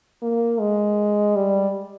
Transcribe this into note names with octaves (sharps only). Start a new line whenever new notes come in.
A#3
G#3
G3